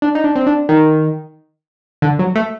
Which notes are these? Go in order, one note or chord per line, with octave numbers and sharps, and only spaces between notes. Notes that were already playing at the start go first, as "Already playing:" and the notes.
D4
D#4
D4
C4
D4
D#3
D3
F#3
A3